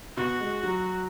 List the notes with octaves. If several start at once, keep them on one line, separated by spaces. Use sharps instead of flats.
B2 F#4
G#3
F#3